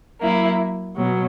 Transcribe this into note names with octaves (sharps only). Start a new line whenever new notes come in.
F#3 A#3 E4
B2 F#3